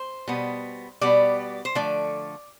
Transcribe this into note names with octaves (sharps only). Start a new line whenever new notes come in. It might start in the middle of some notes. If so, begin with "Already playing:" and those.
Already playing: C5
B2 G3 B3
B2 G3 B3 D5
C5
D3 F3 A3 D5